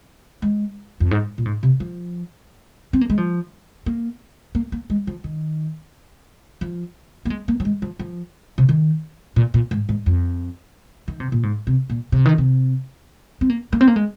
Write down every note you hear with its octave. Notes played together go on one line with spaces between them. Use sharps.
G#3
F2
G#2
A#2
G#2
C3
F3
C4
A#3
G#3
F3
A#3
A#3
A#3
G#3
F3
D#3
F3
A#3
G#3
A#3
F3
G#3
F3
F3
C3
D#3
A#2
A#2
G#2
G#2
F2
D#3
C3
A#2
G#2
C3
A#2
C3
D#3
C3
C4
A#3
A#3
C4
A#3
G#3